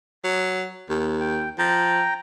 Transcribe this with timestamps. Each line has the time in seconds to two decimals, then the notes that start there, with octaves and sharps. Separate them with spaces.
0.24 F#3
0.90 D#2
1.21 G5
1.59 F3 G5 A#5